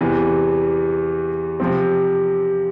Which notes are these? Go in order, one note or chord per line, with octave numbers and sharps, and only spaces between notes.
E2 C3 E3
C3 F3 C4